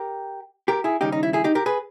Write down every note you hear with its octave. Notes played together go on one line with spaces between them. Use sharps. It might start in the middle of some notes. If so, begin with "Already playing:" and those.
Already playing: G4 A#4
G4 A#4
E4 G#4
D#2 C#3 G3 C#4 D#4 G4
D#4
E4
E4 G#4
D#4 G4
G4 A#4
G#4 B4